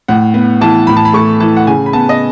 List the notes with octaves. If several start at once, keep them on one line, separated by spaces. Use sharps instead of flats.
A2 F#5
B3
E3 A5
A2 B5
A5
B5
A3 C#6
E3 A5
F#5
C#3 G#5
B5
B3 A5
D#5